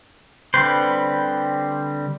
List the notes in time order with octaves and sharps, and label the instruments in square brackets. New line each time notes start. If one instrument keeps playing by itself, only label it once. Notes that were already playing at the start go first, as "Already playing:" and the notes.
[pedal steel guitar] D3 G3 C4 B4 C5